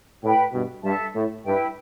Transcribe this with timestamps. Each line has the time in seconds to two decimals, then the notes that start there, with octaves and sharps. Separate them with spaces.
0.22 A2 B4 G5 B5
0.52 G2 B2
0.83 G2 A4 E5 A5
1.14 A2
1.44 G2 E4 B4 E5 G5